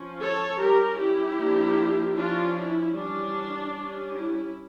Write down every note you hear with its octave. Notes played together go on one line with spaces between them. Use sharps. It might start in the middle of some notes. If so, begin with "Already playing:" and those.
Already playing: F3 C#4
A4 C#5
G3 C#4 G4 A#4
E4 G4
F3 A#3 D4
F3 C#4 D4 F4
E4
E3 G3 C#4 D4
G3 C#4
E4